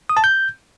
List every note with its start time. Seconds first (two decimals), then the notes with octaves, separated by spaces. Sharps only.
0.09 D#6
0.17 A5
0.24 G6